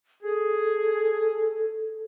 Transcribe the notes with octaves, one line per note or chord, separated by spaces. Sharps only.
G#4 A4